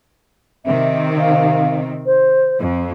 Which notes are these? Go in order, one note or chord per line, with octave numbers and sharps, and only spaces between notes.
C3 D#3 C4 E5
F5
C5
F2